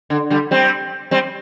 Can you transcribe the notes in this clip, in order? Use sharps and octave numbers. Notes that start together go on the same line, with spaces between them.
D3
D3 G3
G3 C4
G3 C4